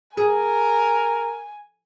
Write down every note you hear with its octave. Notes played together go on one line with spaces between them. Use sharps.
G#4 A#4 G#5